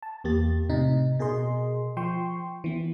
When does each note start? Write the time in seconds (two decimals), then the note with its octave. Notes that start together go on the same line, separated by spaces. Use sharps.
0.03 A5
0.24 E2 A#3 G4 A6
0.69 A2 C3 D#4
1.19 B2 G#4 A#4 D#5 C6
1.97 F3 G5 C6 C#6
2.64 E3 B3